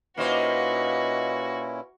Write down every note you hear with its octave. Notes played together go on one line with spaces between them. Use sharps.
A#2 A#3 C#4 D#4 E4 F#4 B4 C5